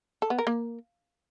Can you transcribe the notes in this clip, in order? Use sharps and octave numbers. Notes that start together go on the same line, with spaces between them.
A4
B3
A#4
A#3